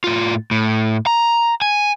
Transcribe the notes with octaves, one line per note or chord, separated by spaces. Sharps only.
A2 F4
A2
A#5
G#5